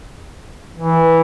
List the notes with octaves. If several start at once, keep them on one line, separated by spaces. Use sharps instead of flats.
E3